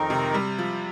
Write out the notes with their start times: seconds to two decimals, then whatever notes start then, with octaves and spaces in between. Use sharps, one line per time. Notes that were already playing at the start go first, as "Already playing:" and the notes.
Already playing: F2 D#3 C4 D#4 A#4
0.10 C3
0.34 G3
0.59 F3